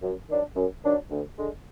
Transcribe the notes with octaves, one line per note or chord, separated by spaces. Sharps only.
F#2
D#3 F#3 D4
F#2
D#3 F#3 D4
D2
D3 G#3